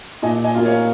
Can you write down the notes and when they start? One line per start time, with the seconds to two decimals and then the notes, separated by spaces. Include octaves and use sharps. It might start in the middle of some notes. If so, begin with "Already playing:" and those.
0.22 A#2 D#5 G#5
0.44 D#5 G#5
0.55 A#3 F4
0.65 C#5 F5